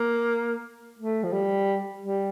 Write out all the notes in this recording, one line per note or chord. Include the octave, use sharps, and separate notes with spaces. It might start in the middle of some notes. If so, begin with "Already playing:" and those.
Already playing: A#3
A3
F3
G3
G3